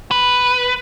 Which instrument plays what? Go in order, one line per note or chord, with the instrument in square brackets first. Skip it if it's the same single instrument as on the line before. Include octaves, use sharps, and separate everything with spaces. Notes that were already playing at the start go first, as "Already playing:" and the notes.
[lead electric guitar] B4